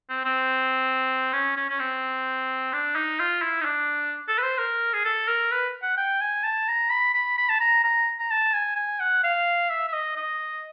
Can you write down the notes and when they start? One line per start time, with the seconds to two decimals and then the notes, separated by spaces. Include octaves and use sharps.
0.09 C4
0.25 C4
1.33 C#4
1.57 C#4
1.69 C#4
1.79 C4
2.73 D4
2.95 D#4
3.19 F4
3.42 E4
3.61 D#4
3.65 D4
4.28 A4
4.38 B4
4.42 C5
4.58 A#4
4.93 G#4
5.04 A4
5.28 A#4
5.52 B4
5.82 F#5
5.97 G5
6.21 G#5
6.43 A5
6.68 A#5
6.90 B5
7.14 B5
7.37 B5
7.49 A5
7.60 A#5
7.84 A#5
8.18 A#5
8.30 A5
8.53 G#5
8.76 G#5
9.00 F#5
9.23 F5
9.69 E5
9.87 E5
9.93 D#5
10.16 D#5